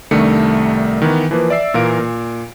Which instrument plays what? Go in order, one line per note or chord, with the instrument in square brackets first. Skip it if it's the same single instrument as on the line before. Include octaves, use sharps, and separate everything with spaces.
[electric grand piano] C2 D#3 A3 D4 C#7
D#3 E3 B3
E3 F3 A#3 B4
D5 E5 E6 C7
A#2 E3 A#4 F5 D7
A#2